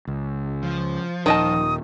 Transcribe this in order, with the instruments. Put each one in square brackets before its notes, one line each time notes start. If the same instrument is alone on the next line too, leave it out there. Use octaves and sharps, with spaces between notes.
[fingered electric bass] C#2
[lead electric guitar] F3
[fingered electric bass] D#1 [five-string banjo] D#3 D#5 A5 [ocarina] D#6